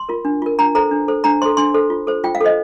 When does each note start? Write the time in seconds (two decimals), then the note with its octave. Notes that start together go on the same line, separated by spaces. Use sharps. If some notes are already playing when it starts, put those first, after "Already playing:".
Already playing: C6
0.09 F4 A#4
0.25 D4
0.42 F4 A#4
0.59 D4 A#5
0.75 A4 C5 A#5
0.91 D4
1.08 A4 C5
1.24 D4 A#5
1.42 A4 C5 C6
1.57 D4 C6
1.74 A4 C5
1.90 F4
2.07 A4 C5
2.24 F4 G5
2.35 F5
2.41 A4 C5 D#5